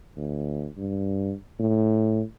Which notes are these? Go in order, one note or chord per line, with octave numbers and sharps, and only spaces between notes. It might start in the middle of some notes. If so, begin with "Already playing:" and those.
D2
G2
A2